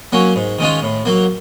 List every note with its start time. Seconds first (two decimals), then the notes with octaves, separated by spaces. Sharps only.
0.12 F#3 A#3 C#4
0.36 G#2
0.59 D#3 G#3 C#4 F4
0.82 A2
1.05 F#3 A#3